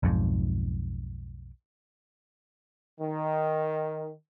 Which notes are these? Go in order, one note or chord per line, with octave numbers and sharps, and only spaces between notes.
B1 F2 G#2
D#3